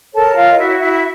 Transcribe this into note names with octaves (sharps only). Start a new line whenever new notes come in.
A4 A#4 C#5 A5
F4 F5
D#5
E4 F#4 E5
E4 E5
E5